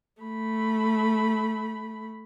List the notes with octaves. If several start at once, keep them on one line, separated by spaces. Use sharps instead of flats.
A3 B5